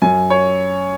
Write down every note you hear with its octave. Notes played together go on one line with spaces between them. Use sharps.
F#2 G#5
C#5